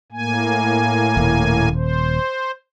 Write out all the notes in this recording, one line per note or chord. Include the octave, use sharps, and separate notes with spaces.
A2 A#3 G#5
D#1
C5